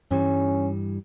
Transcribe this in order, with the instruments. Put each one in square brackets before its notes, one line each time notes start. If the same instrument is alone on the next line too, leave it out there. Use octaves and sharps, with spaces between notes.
[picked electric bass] G2 E3 G3 [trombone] C#4